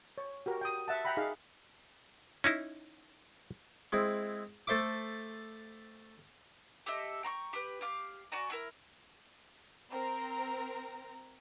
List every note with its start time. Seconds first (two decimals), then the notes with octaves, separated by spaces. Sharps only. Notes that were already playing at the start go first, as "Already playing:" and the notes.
0.18 C#5
0.46 F#4 G4 A#4
0.61 G5 D#6
0.88 E5 F#5 A5
1.05 E5 F#5 G5 A#5 B5
1.17 D#4 G#4 F5
2.44 C#4 D#4 E4
3.92 G#3 C4 E4
4.67 A3 A4 C5 E5 D6
6.86 G4 A4 D#5 E5
7.23 G5 A#5 C6 C#6
7.53 G4 B4
7.81 G4 F5 D6
8.32 F#4 D5 G#5 A#5
8.50 D4 E4 A#4
9.91 C4 A#4 A#5